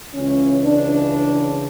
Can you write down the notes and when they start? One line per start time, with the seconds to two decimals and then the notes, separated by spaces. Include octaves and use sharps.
0.14 C#2 C#3 E3 C#4
0.64 D4